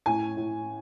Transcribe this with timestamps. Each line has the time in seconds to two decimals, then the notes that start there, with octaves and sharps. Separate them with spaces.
0.06 A2 G#5
0.37 A2